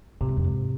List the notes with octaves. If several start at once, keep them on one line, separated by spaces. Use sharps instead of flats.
A2 C3
G#2
F2
G#2